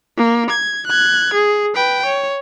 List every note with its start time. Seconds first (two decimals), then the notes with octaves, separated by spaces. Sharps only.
0.18 A#3
0.50 G#6
0.87 F#6 G#6
1.34 G#4
1.75 B4 G5
2.06 C#5